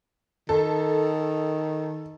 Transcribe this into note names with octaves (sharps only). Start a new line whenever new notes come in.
D#3 A4